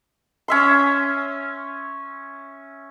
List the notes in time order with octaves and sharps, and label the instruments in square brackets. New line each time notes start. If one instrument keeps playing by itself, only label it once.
[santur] C#4 E5 C6